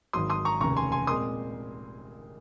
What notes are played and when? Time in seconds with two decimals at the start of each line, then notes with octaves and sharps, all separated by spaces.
0.13 G#1 G#2 F#3 C6 D#6
0.30 C6 D#6
0.45 A#5 C#6
0.60 F1 D#2 C#3 A#5 C#6
0.77 G#5 C6
0.92 G#5 C6
1.07 A#2 G#3 C4 C6 D#6